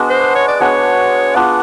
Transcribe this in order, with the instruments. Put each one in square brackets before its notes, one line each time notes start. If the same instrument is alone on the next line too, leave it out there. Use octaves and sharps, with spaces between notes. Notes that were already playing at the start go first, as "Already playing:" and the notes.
Already playing: [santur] G#3 B3 D4 F#4
[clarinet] C5
C#5
D5
[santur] G#3 B3 D4 F#4 [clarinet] C#5
[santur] B3 D4 F4 G#4 [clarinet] F#5